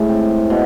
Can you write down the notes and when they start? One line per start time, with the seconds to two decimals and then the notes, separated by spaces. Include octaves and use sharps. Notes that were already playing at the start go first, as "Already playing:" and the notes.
Already playing: A2 G#3
0.09 C4
0.50 B2